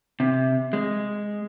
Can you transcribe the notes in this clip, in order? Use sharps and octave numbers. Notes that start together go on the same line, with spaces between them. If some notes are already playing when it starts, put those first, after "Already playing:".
C3
G#3